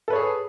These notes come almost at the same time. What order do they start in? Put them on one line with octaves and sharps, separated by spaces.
A4 B4 C#5 G#4